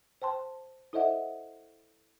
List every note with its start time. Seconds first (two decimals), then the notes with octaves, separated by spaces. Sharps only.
0.22 C5 G5 A5 C6
0.93 E4 A4 C5 D#5 E5 F#5